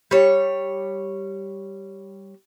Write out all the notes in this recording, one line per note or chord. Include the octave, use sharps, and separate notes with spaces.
G3 C#5